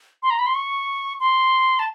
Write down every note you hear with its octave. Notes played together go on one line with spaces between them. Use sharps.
C6
A#5
B5
C6
C#6
C6
A5